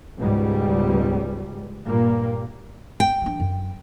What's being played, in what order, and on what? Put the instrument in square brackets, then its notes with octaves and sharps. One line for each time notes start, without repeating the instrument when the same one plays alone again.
[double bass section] C#2 G#2 B2 G3
G2 A#2 G3 A#3
[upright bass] F2 [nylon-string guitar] G5
[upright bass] E3 D4
F#2